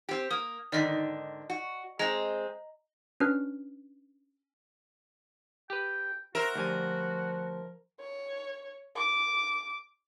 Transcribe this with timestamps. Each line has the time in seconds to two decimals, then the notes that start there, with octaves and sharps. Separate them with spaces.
0.09 C4 G4
0.31 A#3 D#6
0.72 G#2 D3 D#3 D5 D#5 B6
1.50 F#4
1.99 G#3 C4 D#5 A#5
3.20 C#4 D4 F#4 B4 F6
5.70 G4 B4 G5
6.35 F#4 A#4 C5 E5
6.55 D2 F3 G3 G#5
8.00 C#5
8.96 D6